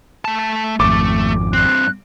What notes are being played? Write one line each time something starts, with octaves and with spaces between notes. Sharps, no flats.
A3 A5
G#1 F2 A3 D6
G2 C4 F#6